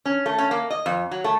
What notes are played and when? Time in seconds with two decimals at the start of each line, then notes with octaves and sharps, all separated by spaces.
0.06 C#4
0.26 A3
0.38 C#4
0.51 A#3
0.70 D#5
0.86 F2
1.11 F#3
1.24 A3